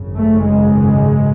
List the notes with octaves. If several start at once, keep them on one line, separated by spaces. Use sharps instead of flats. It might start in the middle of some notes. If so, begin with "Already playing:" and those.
Already playing: G#1 F#2 C#3
A3
G#3